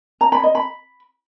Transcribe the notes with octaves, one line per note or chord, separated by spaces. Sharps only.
A#5
B5
D#5
B5